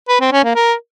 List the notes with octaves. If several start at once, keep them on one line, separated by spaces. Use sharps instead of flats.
B4
C4
C#4
A#3
A#4